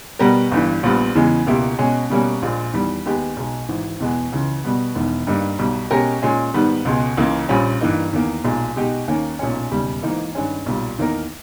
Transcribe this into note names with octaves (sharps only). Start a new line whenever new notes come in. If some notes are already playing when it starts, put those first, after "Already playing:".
B2 G3 B3 G4 A#4
G1 G2 E3
A#1 A#2 G3 B3
E2 C#3 E3 G#3 B3
C#2 B2 A#3 E4 G4
B2 G#3 C#4
B2 G3 A#3 C#4
A#1 A#2 G#3
E2 D#3 G3
D#2 D#3 G#3 B3 G4
B1 B2 G#3
G#1 G#2 E3
E2 B2 G#3 B3
C#2 C#3 E3
B2 G3 B3
E1 E2 D#3
G2 G3 A#3 D#4
B1 B2 G3
B2 G#3 C#4 G4 A#4
A#2 G#3 C#4
G#2 D#3 G3 B3
C#2 B2 G#3
C#2 C#3 E3 A#3
A#1 A#2 G3 C#4
G2 E3 A#3 D#4
E2 D#3 A#3
B1 A#2 G#3
B2 G#3 D#4 G4
D#2 D#3 A#3 C#4
B1 A#2 G#3 C#4
E1 D#2 C#3 G3
G#1 G#2 E3 A#3 D#4
G2 D#3 G#3 C#4
B1 A#2 G3
E2 D#3 A#3 D#4 A#4